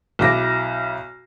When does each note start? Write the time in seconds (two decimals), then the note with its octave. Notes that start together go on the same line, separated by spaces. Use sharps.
0.19 B1 E4 D6 A#6